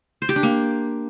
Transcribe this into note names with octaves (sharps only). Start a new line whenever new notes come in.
C5
G4
D4
A#3